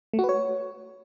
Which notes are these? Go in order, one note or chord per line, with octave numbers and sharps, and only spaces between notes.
A3
F#4
B4
C#5